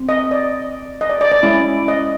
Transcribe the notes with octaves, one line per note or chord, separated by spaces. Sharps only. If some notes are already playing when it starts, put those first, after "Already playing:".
Already playing: C4
D#5
D5
D#5
D5
D5
D5
G#3 C#4 E4
D#5